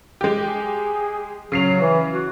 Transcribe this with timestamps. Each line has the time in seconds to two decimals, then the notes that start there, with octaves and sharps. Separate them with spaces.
0.21 G#3 G4
0.44 G#4
1.52 C#3 F#3 C7 F7
1.80 E3
2.12 F#4